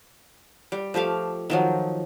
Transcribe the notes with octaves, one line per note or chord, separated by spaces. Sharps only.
G3
F3 A3 G4 F5
D#3 F3 F#3